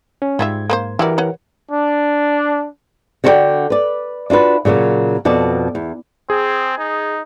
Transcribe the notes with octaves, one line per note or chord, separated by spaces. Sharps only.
C#4
G#2 G3 F4 E5 G#6
A#3 B4 C5
E3 E4 F#4 G4 A#4 D5
B4 C#5 F#5
D4
D3 F#4 A4 C5 D5 G5
B4 D5
D4 F4 F#4 B4
A#2 C#3 E3 F#3 A#3
F2 B2 D5 A5
E2
C4 G#4
D#4